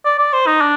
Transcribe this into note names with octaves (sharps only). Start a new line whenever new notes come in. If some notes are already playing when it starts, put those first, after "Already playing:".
D5
D5
C5
D#4
D4